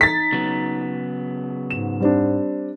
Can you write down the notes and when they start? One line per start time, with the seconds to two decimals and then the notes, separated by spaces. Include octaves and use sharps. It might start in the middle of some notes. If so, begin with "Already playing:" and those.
0.01 D#4 A6 B6
0.33 C#3 F#3 B3
1.70 G#2 E7
2.01 G3 C4 D4